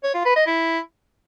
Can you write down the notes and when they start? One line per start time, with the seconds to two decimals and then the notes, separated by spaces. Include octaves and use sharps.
0.04 C#5
0.14 F4
0.25 B4
0.36 D#5
0.47 E4